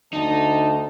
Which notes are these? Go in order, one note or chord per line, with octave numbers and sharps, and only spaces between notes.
D2 D#4 A5